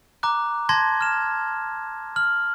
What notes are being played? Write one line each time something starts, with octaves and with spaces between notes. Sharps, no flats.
A#5 D6 F#6
A5 C6 G#6 A#6
F6 E7
F6 F#7